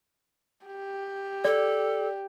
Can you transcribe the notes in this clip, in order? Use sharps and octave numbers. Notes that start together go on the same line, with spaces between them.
G4
A4 D5